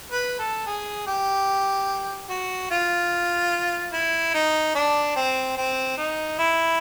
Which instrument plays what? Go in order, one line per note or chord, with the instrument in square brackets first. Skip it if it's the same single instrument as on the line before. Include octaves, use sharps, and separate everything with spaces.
[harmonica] B4
A4
G#4
G4
F#4
F4
E4
D#4
D4
C4
C4
D#4
E4